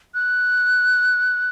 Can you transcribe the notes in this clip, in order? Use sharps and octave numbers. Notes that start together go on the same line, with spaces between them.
F#6